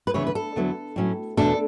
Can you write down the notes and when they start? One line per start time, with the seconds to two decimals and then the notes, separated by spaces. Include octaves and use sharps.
0.07 B4
0.14 D2 C#3 E3 B3 E4 C#5
0.27 B4
0.35 A4
0.56 E2 D3 F#3 B3 E4
0.96 A2 F#3 C#4 E4
1.37 E2 B2 A3 D4 A4